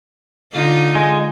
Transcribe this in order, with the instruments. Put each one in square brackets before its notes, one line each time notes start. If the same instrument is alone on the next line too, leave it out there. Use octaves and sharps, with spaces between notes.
[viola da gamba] D3 D#4 F4
[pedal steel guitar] G#3